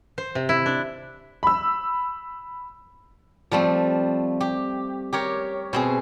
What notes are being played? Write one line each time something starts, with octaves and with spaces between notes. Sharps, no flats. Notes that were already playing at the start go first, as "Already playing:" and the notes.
C5
C3
E4
D4
B5 E6
F3 G3 A3 C4
G4
G4 A#4 C#5
B2 C4 G#4